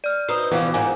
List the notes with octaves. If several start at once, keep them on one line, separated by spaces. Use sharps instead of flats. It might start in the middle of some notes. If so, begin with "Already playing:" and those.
D5 F6
D#4 F#4 B4 C5 D#6
B2 E3 F3 G3 D6
F2 G#2 D#3 G#5